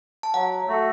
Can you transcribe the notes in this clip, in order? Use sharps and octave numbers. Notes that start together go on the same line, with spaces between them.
A5
F#3 F#5
A3 F#4 A4